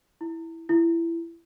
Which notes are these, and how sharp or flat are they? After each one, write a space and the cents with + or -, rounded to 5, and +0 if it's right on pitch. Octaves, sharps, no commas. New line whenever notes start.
E4 -5
E4 +20